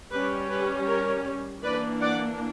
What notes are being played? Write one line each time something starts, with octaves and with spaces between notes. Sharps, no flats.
G3 C#4 G4 B4
G4 B4
A#4 C#5
E3 A#3 D4 B4 D5
D5 F#5